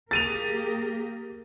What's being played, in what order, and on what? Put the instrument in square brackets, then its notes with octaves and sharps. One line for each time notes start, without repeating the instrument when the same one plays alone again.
[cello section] A#3 G4 A#4 [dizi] G#4 [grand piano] A6 D#7 F7